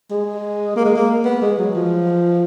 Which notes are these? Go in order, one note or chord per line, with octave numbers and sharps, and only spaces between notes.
G#3
A#3
G#3
A#3
B3
G#3
F#3
F3